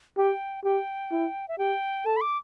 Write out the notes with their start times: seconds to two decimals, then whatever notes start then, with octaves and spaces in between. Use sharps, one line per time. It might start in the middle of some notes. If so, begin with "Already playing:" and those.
0.17 G4 G5
0.64 G4 G5
1.11 E4
1.48 E5
1.58 G4 G5
2.05 A4 A5
2.16 B5
2.21 D6